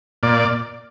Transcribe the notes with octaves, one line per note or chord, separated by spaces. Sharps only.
A#2 D5